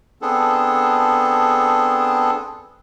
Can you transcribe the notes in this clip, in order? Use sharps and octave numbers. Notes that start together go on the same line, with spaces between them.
B3 C4 D4 G#4 A4